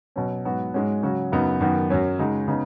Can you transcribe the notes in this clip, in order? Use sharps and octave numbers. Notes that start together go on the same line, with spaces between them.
B2 F#3 C#4
G#2 F#3 B3 F#4
G#2 G#3 C#4 F#4
C#3 F#3 C#4 F#4
F#2 C#3 B3 D#4 F#4
F#2 D#3 B3 F#4
F#2 F#3 C#4
C#3 G#3 D#4 F#4
C#3 B3 D#4